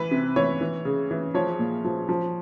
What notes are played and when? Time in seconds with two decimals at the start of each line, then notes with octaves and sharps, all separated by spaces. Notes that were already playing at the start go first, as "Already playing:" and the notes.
Already playing: E3 B4
0.11 C3
0.36 E3 C#5
0.61 E3
0.85 C#3
1.11 E3
1.34 F3 C#5
1.59 A#2
1.85 F3
2.09 F3